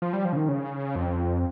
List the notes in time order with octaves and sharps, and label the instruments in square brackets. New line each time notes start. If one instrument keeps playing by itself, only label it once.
[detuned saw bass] F3
G3
F3
C#3
D#3
C#3
F2